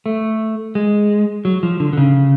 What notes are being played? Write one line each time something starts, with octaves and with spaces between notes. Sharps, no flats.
A3
G#3
F#3
F3
D3
D3
C#3